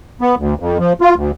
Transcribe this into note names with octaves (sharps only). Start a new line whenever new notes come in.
B3
D2
F2
F3
F4
D2